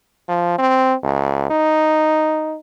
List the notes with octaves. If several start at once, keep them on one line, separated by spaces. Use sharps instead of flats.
F3
C4
C#2
D#4